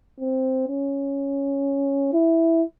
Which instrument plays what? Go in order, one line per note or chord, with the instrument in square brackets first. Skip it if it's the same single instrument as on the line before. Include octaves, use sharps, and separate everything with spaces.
[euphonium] C4
C#4
E4